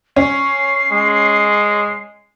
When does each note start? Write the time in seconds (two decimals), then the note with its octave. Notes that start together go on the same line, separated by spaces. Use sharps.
0.16 C#4 C7
0.91 G#3